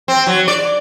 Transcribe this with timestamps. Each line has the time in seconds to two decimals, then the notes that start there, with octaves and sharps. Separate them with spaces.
0.08 C4
0.27 F#3
0.48 D5